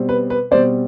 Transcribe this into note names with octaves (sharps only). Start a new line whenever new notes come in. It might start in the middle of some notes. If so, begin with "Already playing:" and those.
Already playing: B2 G3 C4
B4
B4
B2 G3 C4 C5 D5